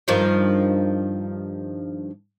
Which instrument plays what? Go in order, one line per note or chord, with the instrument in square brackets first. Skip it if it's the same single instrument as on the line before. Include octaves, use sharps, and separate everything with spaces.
[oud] G2 D#3 F3